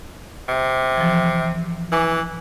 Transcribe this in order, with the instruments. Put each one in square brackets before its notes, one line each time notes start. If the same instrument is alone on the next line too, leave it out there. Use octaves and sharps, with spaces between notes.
[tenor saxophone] C3
[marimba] E3 F3
[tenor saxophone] E3 [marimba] G#5 D6